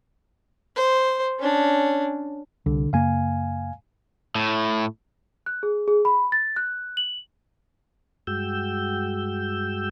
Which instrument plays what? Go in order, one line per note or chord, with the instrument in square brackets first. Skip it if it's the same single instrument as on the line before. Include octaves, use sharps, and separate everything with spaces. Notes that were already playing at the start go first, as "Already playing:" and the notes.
[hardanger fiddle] C5
C#4 D4
[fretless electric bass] C2 [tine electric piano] D3
[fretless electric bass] F#2 C#3 A#3 [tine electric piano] F5 G#5
[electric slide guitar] A2
[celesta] F#6
G#4
G#4
B5
A6
F#6
F#7
[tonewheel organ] G2 G#3 F#4 G5 E6 G6